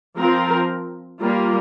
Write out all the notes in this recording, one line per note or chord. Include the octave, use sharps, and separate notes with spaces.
F3 C4 F4 A#4
G3 A#3 F4 A#4